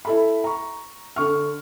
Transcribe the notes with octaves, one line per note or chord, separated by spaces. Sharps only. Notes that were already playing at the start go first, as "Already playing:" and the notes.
E4 A4 B5
A#5 C#6
D3 C#6 F6